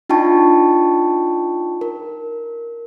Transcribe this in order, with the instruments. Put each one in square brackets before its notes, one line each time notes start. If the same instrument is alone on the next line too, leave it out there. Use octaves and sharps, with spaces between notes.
[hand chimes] D4 D#4 F4 G5 A5 C#6
A#4